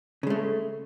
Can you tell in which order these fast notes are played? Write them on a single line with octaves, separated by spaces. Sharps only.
C#3 G#3 A3